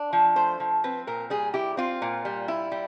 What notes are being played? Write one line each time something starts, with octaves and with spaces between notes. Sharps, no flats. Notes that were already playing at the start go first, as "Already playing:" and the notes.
Already playing: D4
F3
A3 C5
F3
C4 B4
A#2 A#4
G3 G#4
E4 G4
C4 F4
A#2
G3
E4
G3